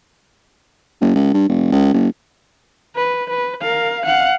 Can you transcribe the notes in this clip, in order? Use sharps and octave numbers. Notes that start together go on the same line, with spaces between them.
F#1
C#2
G2
F1
C#2
F#1
B4
B4
A#4 F5
F5 F#5